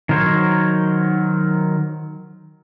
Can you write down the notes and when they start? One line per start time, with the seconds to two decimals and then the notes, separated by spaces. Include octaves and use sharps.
0.09 D#3 F#3 A#4 C5 C#5